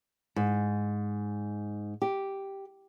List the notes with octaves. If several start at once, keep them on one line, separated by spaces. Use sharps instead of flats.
G#2
G4